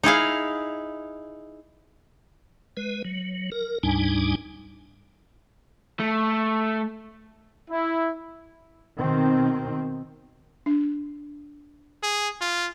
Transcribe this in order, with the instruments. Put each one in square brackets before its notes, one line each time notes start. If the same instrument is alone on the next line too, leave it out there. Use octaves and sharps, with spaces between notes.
[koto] D#4 E4 G#4 F5
[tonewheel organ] G#3 B4
F#3
A#4
D2 G#2 G3 D4 D#4 G#5
[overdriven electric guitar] A3
[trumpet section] E4
[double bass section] B2 D#3 C4
[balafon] D4
[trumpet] G#4
F4